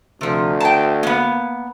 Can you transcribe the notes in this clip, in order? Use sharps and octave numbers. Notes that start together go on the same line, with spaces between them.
D2 C3 F3
G5 A5
A#3 B3